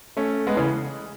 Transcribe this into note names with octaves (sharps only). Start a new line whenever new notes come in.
A3 C#4
G#3 B3
C#3 E3